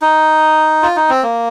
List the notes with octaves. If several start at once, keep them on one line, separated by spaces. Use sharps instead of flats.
D#4
F4
D#4
C4
A#3